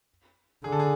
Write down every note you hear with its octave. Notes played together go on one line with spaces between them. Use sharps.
D3 G#4
A4
G#4